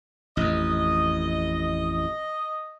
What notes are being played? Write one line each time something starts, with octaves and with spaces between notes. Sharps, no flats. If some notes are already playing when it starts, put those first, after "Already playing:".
A1 F2 D#5